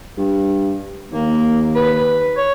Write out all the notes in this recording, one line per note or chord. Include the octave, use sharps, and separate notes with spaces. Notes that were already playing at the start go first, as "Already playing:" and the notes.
G2
D#2 A#3
B4
C#5